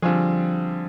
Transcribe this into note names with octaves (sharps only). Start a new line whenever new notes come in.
D3 F3 G3 C4 F4 G#4